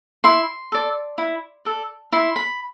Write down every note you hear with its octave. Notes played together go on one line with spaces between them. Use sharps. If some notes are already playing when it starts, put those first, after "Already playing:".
E4 C6
A4 D5
E4
A4 D5
E4 C6
B5